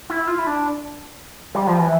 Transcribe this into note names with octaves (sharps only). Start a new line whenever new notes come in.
E4
F4
E4
D4
G3
F3
E3